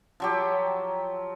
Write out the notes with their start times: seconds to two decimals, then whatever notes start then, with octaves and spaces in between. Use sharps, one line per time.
0.20 F3 F#3 G4